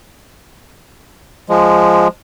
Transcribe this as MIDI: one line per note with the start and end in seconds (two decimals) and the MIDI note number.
1.49 2.08 53
1.49 2.08 56